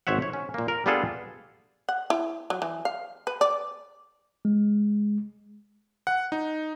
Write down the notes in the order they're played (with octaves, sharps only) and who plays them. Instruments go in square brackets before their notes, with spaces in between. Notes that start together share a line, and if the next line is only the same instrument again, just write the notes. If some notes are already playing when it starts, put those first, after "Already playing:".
[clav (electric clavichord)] G#1 C5 C#5 E5 F#5
C#5
C#4
A#2 A#3
A#4
G3 B3 D4 F4 G#4 A4
[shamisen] F#5
E4
F#3
E3
F5
B4
D5
[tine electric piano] G#3
[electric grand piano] F#5
D#4